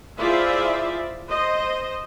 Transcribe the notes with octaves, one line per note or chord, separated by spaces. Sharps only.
E4 F4 G#4 C5 D5 E5
C5 D#5